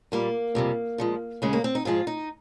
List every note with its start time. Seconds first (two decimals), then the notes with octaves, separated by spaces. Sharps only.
0.12 A#2 G3 A#3
0.55 F2 C3 G3
0.98 A#2 F3 G#3
1.42 D#2 C#3 G#3 C#4
1.53 A#3
1.64 C4
1.75 D#4
1.85 G#2 F3 G#3 F4
2.07 D#4